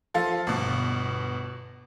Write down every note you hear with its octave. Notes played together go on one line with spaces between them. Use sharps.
F3 F4 A4
G1 B2